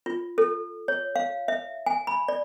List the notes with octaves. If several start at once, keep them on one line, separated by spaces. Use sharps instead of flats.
F4
A4
C#5
F5
E5
G#5
B5
D5